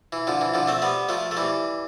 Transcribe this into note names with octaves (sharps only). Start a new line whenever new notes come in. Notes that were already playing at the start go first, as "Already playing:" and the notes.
E3
D3 F3
E3
D3 F3
A3 C4
G3 B3
F3 A3
A3
E3 G3